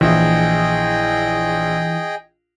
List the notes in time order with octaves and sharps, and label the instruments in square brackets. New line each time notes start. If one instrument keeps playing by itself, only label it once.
[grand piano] A#1 [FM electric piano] E3 E4 [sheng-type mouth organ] G#4 D#5 G5